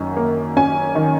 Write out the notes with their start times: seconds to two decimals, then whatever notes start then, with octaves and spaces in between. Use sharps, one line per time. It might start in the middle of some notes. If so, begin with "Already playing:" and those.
Already playing: F#2 D#3 C#4
0.17 A#3
0.56 C#4 G#5
0.95 D#3